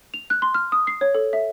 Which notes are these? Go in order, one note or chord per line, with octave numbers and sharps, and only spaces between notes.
F7
F#6
C6
F6
D#6
C7
C#5
A4
E5